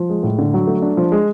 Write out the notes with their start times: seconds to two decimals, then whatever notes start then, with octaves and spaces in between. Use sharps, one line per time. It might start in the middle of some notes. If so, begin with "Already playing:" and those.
Already playing: F3
0.10 G#3
0.23 A2
0.38 D3
0.54 F#3
0.67 A3
0.82 D4
0.97 F3
1.12 G#3